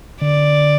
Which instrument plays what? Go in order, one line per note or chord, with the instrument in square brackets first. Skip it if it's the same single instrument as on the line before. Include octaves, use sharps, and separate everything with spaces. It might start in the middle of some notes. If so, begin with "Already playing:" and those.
[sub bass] D3 [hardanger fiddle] D5